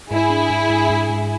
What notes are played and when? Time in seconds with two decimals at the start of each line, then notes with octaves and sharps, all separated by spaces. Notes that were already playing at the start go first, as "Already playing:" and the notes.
0.11 G#2 E4 G#4
0.30 D4
0.50 G#2
0.70 G#2
0.90 G#2
1.10 G#2